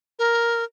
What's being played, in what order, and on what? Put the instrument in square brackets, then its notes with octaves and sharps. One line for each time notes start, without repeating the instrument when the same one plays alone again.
[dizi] A#4